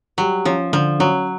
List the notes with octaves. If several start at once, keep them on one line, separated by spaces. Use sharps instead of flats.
F#3 G3
F3 C#4
D3 F3
F#3 C#4